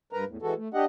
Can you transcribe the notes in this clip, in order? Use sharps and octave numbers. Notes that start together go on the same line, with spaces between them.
G2 A#4 B4 A#5
E2 A2
E3 G#3 F#4 A4
A3
D4 G4 D#5 F#5